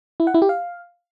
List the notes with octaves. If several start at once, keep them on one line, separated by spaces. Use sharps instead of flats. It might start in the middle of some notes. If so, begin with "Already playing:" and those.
E4
F#5
E4
G4
F5